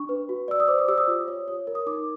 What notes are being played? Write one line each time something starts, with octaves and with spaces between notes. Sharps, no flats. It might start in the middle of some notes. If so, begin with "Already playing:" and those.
Already playing: D4 C#6
B4
F#4
D5 E6
D#6
C5 D6
D#6
G4 E6
D#6
F4
C#5
C#5
A#4
D#6
D#4 D6